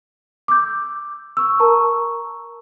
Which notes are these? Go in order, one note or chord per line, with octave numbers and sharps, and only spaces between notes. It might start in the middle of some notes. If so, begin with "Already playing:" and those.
D6 E6 G6
C#6 E6
A#4 A5 A#5 C#6